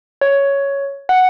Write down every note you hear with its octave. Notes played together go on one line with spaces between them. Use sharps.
C#5
F#5